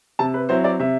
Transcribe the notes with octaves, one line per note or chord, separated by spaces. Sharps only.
C3 A5
B4
F#3 C4 E4 C5
D5
C3 E5